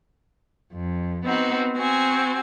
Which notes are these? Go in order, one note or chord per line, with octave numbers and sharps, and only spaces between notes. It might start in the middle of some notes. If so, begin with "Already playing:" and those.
F2
B3 C4 D#4 F#4
C4 F#4 G#5